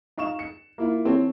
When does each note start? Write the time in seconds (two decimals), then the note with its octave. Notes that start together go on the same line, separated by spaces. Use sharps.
0.17 D#4 F5 C#6 E7
0.39 C#7
0.78 A#3 E4 F4
1.05 E3 C4 A4 C#5